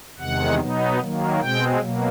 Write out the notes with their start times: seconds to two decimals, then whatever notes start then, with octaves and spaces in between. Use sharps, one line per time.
0.19 E2 C3 D#3 G#3 F#5
0.59 B2 F#3 B3 D#4
0.99 D#3 F#3 A#3
1.40 B2 G#3 C4 G5
1.80 B2 F#3 A#3